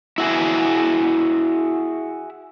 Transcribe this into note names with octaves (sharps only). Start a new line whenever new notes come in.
E4 F#4 G#4